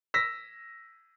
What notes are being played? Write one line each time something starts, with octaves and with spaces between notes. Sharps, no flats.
E6 A#6 B6